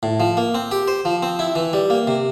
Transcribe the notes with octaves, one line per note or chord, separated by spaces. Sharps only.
A2
F3
A#3
C4
G4
C5
F3
C4
E4
E3
G3
A#3
C3